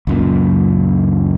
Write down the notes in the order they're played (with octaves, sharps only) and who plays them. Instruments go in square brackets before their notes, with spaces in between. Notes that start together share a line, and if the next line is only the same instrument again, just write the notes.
[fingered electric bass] C#2 F#2 A#2